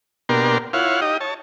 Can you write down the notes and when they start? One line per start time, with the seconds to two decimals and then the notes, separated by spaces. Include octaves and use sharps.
0.29 B2 A#3 D4 G4 A#4 C6
0.73 E4 F4 C#5 F5 F#5
1.01 D#4 G4 D#5
1.20 C#5 A5